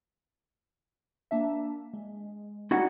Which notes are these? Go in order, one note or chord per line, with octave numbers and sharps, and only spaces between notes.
A#3 D4 E5
G#3
G3 C#4 D#4 E4 F#4 F#5